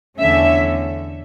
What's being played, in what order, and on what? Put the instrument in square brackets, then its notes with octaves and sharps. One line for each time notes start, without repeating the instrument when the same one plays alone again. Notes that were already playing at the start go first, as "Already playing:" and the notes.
[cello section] E2 D3 A3 C#4 E5